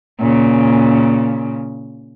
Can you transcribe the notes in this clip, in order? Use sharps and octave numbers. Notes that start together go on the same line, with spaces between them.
A#2 C#3